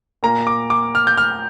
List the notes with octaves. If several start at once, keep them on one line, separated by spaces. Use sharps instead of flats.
A#2 A#3 A#5
D6
D6
F6
G6
F6